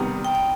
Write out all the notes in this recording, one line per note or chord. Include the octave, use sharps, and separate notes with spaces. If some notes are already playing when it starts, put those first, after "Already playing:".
Already playing: C3 D#3 G3 B3
G5
G5